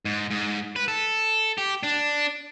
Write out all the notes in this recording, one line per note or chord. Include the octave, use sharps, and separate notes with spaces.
G#2
G#2
B4
A4
G4
D4